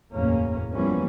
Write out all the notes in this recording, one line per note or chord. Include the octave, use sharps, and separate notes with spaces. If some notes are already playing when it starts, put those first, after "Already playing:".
F#1 E2 A2 A#3 C#4
E3 F3 G3 A#3 B3 C#4